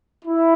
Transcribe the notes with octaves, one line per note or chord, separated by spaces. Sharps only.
E4